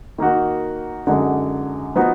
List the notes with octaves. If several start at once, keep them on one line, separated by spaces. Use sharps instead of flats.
D#3 A#3 D#4 F#4
F#2 D3 G#3 D#4 F#4
F3 B3 D#4 F#4